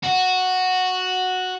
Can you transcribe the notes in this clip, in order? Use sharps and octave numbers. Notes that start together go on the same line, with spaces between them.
F#4